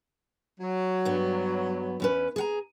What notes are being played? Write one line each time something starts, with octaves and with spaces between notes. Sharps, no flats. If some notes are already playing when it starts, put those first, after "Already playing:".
F#3
G2 B3
E2 C#4 B4
G#4 F#5 A#5